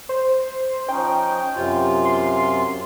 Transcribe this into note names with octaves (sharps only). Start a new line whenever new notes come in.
C5
F3 C#4 D#4 G5
F#2 C3 F4
C6